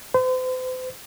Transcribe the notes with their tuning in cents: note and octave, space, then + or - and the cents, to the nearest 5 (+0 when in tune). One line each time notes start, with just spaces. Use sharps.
C5 -40